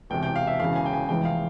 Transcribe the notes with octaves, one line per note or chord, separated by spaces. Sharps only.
E1 E2 C3 G5
G5
F5
E5
E1 E2 C#3 F5
G#5
G5
G#5
F1 E2 E3 G#3 G5
F5